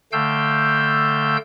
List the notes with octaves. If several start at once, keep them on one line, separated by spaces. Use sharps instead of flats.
D3 A3 F5 G5 E6 G6